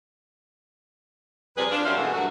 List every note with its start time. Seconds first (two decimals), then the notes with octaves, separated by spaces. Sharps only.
1.56 F2 C3 G3 G#4 B4
1.69 D4 F4
1.84 F#2 G3 C#4 C5 E5 F5
1.96 B2 E3 A#3 F#4 G#4 A4
2.13 G2 F#3 A3 F#4